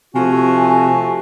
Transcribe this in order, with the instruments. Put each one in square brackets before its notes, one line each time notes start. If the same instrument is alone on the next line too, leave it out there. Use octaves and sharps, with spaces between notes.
[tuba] C3 [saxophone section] F3 A3 [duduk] F#4 [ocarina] G#5